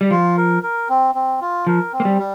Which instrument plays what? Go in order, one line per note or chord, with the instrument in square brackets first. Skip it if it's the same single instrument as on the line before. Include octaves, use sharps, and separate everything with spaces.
[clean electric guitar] G3
[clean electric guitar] F3 [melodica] F4
[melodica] A#4
A#4
C4
C4
F4
[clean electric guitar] F3 [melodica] A#4
[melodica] C4
[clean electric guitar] A#3
G3
[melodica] G3